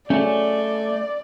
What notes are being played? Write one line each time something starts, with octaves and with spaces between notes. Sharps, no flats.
A3 C#4 D5